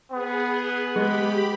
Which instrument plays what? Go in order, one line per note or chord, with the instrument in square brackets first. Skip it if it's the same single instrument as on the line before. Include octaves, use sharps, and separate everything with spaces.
[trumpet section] B3 [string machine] G#4
[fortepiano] G#3 [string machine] G4 B5 [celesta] G#4 B4